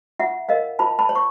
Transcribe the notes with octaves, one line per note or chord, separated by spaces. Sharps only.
F4 E5 F#5
A#4 D#5 F5
F4 A5 B5
A5 B5
C#5
C#6